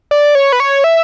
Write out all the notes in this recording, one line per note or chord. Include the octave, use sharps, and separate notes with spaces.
D5
C#5
B4
C#5
E5